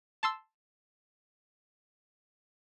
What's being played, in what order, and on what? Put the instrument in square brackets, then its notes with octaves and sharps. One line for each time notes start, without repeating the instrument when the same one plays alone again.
[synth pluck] A5 C6 E6